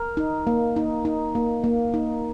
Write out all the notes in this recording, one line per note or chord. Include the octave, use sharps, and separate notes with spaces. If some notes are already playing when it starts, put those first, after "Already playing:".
Already playing: A#4
D#4
A#3
D#4
D#4
A#3
A#3
D#4